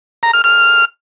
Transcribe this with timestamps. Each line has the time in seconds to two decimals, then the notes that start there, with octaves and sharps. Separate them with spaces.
0.23 A#5
0.33 F6
0.44 F6